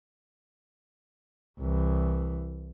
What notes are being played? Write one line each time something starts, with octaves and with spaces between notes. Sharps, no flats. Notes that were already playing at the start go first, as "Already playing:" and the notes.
C2 E3